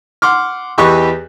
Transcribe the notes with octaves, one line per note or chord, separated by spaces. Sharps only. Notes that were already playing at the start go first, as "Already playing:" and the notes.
F#5 C6 D6 F6
E2 E3 G4 B4 D#5 C#6